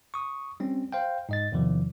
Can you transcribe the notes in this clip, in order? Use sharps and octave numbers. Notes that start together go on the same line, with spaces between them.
C#6 D#6
G3 C4 C#4
C5 F5 G5
G#2 D#5 A6
E2 C3 D#3 F3